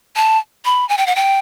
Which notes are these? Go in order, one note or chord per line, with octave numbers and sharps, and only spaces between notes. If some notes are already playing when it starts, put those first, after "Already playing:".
A5
B5
G#5
G5
F#5
G5